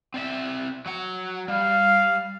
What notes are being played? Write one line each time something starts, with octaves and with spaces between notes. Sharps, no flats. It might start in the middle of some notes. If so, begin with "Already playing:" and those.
C4 D5 E5
F#3 F#5
G3 F5